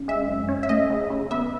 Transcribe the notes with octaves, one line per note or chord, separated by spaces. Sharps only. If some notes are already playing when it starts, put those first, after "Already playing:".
Already playing: C#3
G#3 E5
F#2
C#4
E5
A3 D#5
C#3
C#3
B3 E5